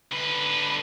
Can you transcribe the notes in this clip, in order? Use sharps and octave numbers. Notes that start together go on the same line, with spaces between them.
D3 B4